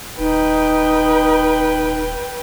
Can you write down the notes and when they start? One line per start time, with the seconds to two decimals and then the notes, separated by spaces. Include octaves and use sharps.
0.18 D#1 D#4 B4 G5